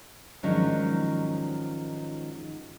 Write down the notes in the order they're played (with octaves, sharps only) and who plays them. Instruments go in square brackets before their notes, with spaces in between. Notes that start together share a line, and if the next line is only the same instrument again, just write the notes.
[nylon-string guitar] G#2 D#3 F3 F#3 C#4 D4